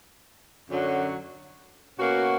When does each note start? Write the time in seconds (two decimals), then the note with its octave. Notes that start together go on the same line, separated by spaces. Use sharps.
0.71 F#2 D3 F#3 C#4 F#4
1.99 B2 A#3 C#4 F#4